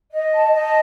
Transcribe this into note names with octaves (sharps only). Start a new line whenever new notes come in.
D#5
A5
D#5